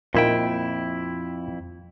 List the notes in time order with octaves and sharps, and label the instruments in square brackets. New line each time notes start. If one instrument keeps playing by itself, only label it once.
[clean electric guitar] F2 E4 G5 [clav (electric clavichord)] A#2 A#3 D#4